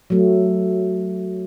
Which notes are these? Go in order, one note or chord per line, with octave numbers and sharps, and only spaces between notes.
F#3 A3